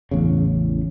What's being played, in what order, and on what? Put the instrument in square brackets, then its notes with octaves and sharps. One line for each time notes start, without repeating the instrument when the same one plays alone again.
[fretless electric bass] A1 E2 C#3